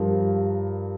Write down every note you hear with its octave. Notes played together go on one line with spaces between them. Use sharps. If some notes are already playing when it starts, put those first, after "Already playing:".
Already playing: G2 F3 A#4